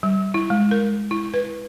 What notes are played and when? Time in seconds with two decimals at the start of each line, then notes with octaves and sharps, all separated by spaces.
0.03 G3
0.34 E4
0.50 G#3
0.71 A#4
1.11 E4
1.34 B4